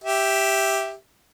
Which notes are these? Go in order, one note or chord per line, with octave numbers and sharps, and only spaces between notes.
G4 E5